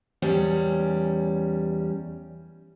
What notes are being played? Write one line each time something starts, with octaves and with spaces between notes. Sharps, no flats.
E2 G3 C#4